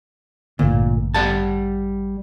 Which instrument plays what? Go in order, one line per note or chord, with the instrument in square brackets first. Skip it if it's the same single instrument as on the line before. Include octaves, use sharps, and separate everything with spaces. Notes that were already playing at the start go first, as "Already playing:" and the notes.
[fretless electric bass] A1 G2 D3 [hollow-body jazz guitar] A#2
[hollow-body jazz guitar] G3 F#5 A5